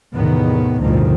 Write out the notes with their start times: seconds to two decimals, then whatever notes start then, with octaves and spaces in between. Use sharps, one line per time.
0.15 E2 A2 C3 D#3 B3
0.81 A1 D2 G2 B2 D#3 F3